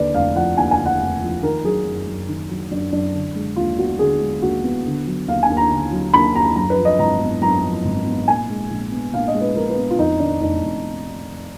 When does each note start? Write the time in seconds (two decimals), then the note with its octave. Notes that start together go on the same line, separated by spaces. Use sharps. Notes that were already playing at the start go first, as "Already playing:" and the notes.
Already playing: D#2 D3 B4 D5
0.14 F1 F5
0.36 F3 F#5
0.57 D#2 G#5
0.71 G#5
0.79 D3
0.86 F#5
1.00 F1
1.22 F3
1.43 D#3 A#4
1.64 F#3 G#4
1.85 F#2
2.07 F#2
2.28 D#3
2.50 F#3
2.71 F#2 D4
2.93 F#2 D4
3.14 D3
3.35 G#3
3.56 D#2 F4
3.78 B3 F#4
3.99 D3 G#4
4.21 G#3
4.42 D#2 F#4
4.64 B3
4.86 D3
5.07 F#3
5.28 D#2 F5
5.43 G#5
5.50 D#2
5.57 A#5
5.70 D3
5.92 F#3
6.14 D#2 B5
6.35 D#2 A#5
6.56 F#2 A#5
6.70 B4
6.77 F3
6.85 D#5
6.99 G#1 A#5
7.21 B3
7.42 F#2 A#5
7.64 F3
7.85 G#1
8.06 B3
8.28 A#2 G#5
8.50 G#3
8.70 A#1
8.92 B3
9.13 A#2 F5
9.28 D#5
9.34 G#3
9.41 B4
9.56 A#1 A#4
9.70 B4
9.77 B3
9.90 F4
9.99 F2 D#4
10.20 D#3 D4
10.41 F1 D#4
10.63 F1